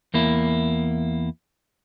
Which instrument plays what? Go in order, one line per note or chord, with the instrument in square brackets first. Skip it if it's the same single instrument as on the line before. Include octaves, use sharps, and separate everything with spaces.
[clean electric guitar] E2 A#3 E4